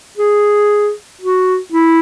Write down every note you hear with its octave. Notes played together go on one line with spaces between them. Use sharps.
G#4
F#4
E4